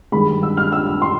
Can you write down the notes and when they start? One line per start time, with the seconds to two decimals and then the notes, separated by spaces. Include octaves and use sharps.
0.12 G2 D#3 G#3 B5
0.43 E6
0.57 F6
0.72 E6
0.87 E6
1.02 C6